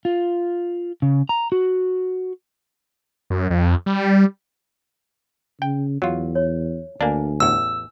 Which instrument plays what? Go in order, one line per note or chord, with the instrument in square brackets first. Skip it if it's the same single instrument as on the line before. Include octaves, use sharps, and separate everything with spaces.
[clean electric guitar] F4
C#3
A#5
F#4
[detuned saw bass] F#2
F2
G3
[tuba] C#3 [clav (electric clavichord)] G5
[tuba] E2 [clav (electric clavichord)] F#3 F4
[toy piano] C#5
[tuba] D2 [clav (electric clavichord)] A#3 D4 [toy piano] F5 G#5
[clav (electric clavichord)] A1 E2 [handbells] E6